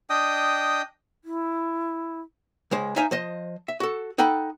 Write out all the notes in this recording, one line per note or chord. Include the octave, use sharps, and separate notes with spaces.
D4 D#5 G5 D#6
E4
C#2 G#3 C5
D#4 C5 E5 F5 G#5 A#5
F3 C5 D#5
E5
F#4 A4
D#4 A4 F#5 G5 B5